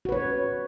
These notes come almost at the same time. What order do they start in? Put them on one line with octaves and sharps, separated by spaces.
F#4 B4 C#5